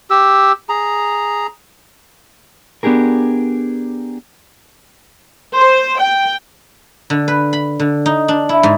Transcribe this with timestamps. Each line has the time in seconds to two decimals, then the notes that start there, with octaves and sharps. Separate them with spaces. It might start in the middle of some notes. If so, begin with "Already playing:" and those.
0.10 G4 E6
0.69 G#4 A#5
2.83 B3 D4 G4 G#4 A#4
5.55 C5
6.01 G5
7.10 D3
7.28 B4
7.53 B5
7.80 D3
8.06 D#4
8.28 D4
8.49 E4
8.63 G#2